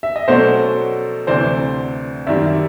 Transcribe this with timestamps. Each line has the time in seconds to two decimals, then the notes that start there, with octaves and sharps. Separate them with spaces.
0.03 E5
0.16 D#5
0.28 B2 F#3 A3 C#4 C5 D5
1.27 D2 C3 E3 C5 D5
2.27 F#2 D#3 G3 D5 E5